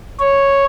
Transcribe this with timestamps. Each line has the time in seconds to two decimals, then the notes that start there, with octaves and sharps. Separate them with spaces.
0.20 C#5